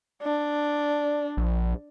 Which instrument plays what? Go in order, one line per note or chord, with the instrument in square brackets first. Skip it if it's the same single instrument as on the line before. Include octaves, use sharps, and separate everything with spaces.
[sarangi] D4
[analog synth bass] A#1